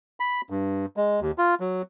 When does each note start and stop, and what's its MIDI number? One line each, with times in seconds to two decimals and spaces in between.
0.20 0.41 83
0.50 0.86 43
0.97 1.20 56
1.21 1.31 39
1.38 1.55 65
1.60 1.82 54